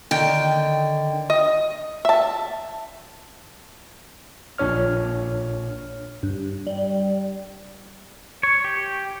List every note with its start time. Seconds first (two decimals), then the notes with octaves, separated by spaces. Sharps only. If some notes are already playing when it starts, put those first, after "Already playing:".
0.11 D3 D#3 G5
1.30 D#5
2.05 E5 A5
4.58 A#1 A#2 D4 C#5 F6
6.23 G2
6.67 G3
8.43 C#5
8.64 G4